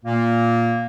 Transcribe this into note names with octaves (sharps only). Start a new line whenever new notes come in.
A#2 A#3